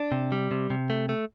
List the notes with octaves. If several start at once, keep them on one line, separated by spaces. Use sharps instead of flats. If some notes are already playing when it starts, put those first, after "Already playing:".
Already playing: D4
C3
G3
C3
C3
A3
A3